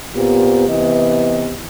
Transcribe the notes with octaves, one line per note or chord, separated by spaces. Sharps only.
A#2 B3 C4 G4
C3 E3 B3 D#5